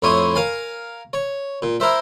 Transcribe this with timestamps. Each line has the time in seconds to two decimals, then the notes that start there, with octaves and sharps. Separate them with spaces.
0.02 F2 A2 E4 C#5 C6 D#6
0.35 A#4 F5 G#5
1.13 C#5
1.62 A#2
1.80 E4 A#4 C5 E5